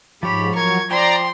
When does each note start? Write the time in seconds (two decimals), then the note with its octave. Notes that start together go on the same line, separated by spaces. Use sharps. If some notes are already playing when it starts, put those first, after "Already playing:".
0.23 G#2 F3 G4 C#5 B5
0.56 F#3 A#4 C#6 G#6
0.91 F3 D5 G5 A#5 C6